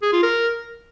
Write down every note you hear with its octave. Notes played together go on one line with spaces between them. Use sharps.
G#4
F4
A#4